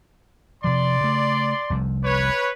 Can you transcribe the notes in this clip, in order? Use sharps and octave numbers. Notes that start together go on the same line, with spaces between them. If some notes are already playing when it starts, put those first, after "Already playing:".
C3 F3 D5 C6
C#3 A3
F1 C2 F2
B4 C#5